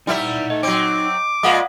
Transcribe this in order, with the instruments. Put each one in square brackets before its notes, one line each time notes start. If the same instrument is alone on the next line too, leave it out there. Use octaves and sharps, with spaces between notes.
[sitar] G3 E4 E5 [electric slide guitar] D#4 F#5 A#5
[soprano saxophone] A3 [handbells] D#5
[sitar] F#3 C4 [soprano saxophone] D6
[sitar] A#2 G#3 [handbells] F5 F#5 D#6